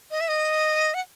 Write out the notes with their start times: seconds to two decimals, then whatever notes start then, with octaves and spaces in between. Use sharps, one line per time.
0.11 D#5
0.21 E5
0.28 D#5
0.94 F#5